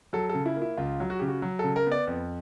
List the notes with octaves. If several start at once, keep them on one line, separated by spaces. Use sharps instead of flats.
F#3 A4
A4
C#3
E4
A#3
E4
C#2 F4
F#3
F#4
C#3 G4
F#4
F#3
C#3 A4
A#4
B3 D5
F2